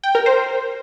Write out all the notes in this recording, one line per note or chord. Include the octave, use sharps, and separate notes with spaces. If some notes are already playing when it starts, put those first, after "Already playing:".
G5
A#4
C5